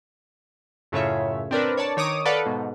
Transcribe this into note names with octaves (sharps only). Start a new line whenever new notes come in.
F#2 A2 C#3 F4 C#5 E5
C4 D4 A#4 B4
C#5 D5 A5
D#3 C#5 D6 D#6
A4 B4 D5 F5 F#5
G#2 B2